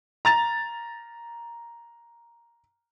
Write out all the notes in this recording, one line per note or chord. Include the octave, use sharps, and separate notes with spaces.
A#5 A6 F7